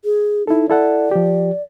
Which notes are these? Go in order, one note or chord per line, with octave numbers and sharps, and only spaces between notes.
G#4
D#4 E4 A4
E4 A4 D5 F#5
F3 G4